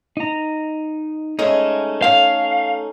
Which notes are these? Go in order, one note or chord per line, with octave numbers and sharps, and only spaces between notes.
D#4 A#5
G#3 A3 C#4 D#4 E5
A3 C#4 F5